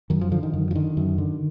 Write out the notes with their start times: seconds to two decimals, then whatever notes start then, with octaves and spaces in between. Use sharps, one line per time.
0.10 F#2 D#3
0.21 F3
0.32 D3 F3
0.43 D#3
0.53 F#2 D#3
0.71 F3
0.75 D3 D#3
0.97 F#2
1.18 D3